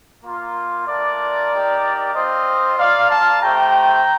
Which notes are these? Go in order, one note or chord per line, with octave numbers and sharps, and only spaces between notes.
A#3 F4
A3 D4 F4 A#4 D5
A#3 D#4 G4
C4 F4 C5 D#5
A#3 F4 D5 F5
F5 A5
A3 C4 G4 G5 A#5